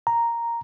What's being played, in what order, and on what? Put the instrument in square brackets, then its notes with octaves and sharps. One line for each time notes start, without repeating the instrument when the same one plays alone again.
[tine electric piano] A#5